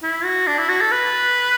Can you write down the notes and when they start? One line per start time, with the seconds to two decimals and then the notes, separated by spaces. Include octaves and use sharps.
0.03 E4
0.25 F#4
0.47 D4
0.59 E4
0.69 F#4
0.81 A4
0.92 B4